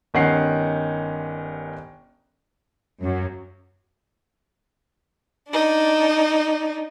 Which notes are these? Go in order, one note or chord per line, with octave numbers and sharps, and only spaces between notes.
G1 D#3 C#4 F#5 C7
F#2
D4 D#4